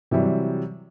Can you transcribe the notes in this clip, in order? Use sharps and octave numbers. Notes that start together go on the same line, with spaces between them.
C3 E3 F#3 G3